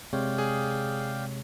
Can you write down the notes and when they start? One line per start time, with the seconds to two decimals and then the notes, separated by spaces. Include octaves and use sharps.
0.13 C3 G#3 C#5 D5 F5 G5
0.38 G#4